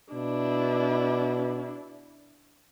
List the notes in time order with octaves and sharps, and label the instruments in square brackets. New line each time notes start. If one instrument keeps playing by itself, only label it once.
[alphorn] B2 [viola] D4 E4